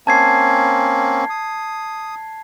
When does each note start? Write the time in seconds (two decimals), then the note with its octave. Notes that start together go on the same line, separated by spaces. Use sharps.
0.07 A#3 C4 C#4 A5 G#6 C7
1.30 D#6